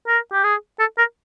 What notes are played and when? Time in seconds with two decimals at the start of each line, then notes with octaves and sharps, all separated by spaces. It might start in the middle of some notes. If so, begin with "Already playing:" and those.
0.07 A#4
0.32 G4
0.44 G#4
0.79 A4
0.98 A#4